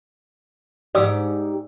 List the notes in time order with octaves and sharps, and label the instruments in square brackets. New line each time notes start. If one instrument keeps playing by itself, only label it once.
[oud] G#2 G4 [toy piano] D5 D#6 E6